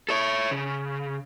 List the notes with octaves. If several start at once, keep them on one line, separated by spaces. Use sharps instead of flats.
A4 C#5
C#3